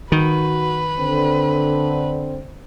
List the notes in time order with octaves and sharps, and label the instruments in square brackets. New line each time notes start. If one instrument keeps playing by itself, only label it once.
[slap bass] D#3 [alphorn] F#4 [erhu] B4
[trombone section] D3 [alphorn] C4